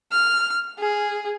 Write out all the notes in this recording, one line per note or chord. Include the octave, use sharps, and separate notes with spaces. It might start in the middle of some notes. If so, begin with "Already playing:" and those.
F6
G#4